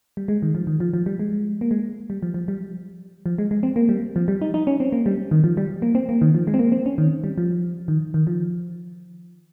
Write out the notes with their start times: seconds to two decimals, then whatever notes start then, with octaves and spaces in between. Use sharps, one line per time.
0.17 G3
0.28 G#3
0.42 D#3
0.55 F3
0.67 D#3
0.80 F3
0.94 F3
1.06 G3
1.19 G#3
1.61 A#3
1.71 G#3
2.10 G3
2.23 F3
2.34 F3
2.48 G3
3.26 F3
3.38 G#3
3.51 G#3
3.63 C4
3.76 A#3
3.89 G3
4.16 F3
4.28 G3
4.42 D#4
4.54 D#4
4.67 C#4
4.80 C4
4.92 A#3
5.06 G3
5.31 D#3
5.44 F3
5.57 G3
5.82 A#3
5.95 C4
6.09 A#3
6.21 D#3
6.34 F3
6.47 G#3
6.54 C4
6.59 A#3
6.72 C4
6.86 C#4
6.98 D#3
7.24 G3
7.38 F3
7.88 D#3
8.14 D#3
8.27 F3